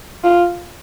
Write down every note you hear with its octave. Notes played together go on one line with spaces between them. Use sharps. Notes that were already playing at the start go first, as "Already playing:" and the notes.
F4